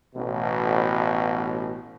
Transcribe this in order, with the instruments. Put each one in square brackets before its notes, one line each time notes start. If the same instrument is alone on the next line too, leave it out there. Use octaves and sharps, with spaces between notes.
[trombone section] A1 B2